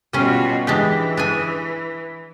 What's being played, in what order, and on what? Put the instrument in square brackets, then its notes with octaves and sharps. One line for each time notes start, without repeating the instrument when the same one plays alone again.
[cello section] B2 F4 F#4 [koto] G3 C#4
[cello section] E3 [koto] G#3 D4 G4
[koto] D4 G#4 G#5